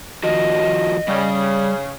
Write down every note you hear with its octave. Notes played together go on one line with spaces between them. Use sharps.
D#3 F3 F#4 D#5
C#3 G3 D5